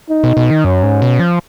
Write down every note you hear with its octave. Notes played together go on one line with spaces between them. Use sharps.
D#4
B2
B2
D#3
F#2 C#4
G#2
B2
F3